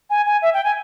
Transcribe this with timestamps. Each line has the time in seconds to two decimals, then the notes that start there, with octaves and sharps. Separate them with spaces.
0.10 G#5
0.26 G#5
0.42 E5
0.54 G5
0.64 G#5